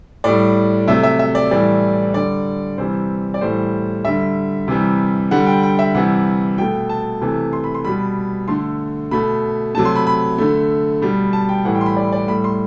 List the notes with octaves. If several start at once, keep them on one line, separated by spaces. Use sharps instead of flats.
A2 G3 D5
C3 F#3 A3 E5
E5
E5
D5
A2 E3 G3 D5
D3 G3 D5
C3 E3 G3 C5
D5
A2 E3 G3 C5
D3 G3 E5
C3 E3 G3
D3 G3 F#5
G5
G5
E5
C3 E3 G3 F#5
B2 A3 G5
A5
C3 E3 A3
C6
B5
C6
B2 G3 B5
D3 A3 C6
B2 A3 B5
C3 F#3 A3 A5
C6
B5
B5
D3 A3
B2 G3
A5
G5
A2 E3 G3 F#5
G5
C6
B5
D5
D5
A2 G3 B5
C6